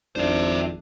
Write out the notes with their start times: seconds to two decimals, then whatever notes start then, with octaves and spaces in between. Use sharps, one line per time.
0.16 G#1 F2 D4 C5 E5